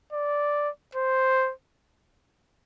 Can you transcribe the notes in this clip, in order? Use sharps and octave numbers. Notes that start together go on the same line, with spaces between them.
D5
C5